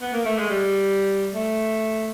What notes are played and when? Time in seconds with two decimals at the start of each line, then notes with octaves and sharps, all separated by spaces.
0.01 B3
0.13 A#3
0.25 A3
0.38 G#3
0.50 G3
1.33 A3